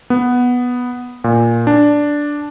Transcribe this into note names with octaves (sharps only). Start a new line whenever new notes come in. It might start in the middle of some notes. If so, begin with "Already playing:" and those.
B3
A#2
D4